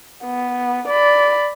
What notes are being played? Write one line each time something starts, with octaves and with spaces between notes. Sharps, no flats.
B3
D5 B5